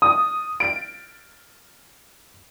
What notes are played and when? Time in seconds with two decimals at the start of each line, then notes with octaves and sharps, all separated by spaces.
0.02 D#6
0.60 D7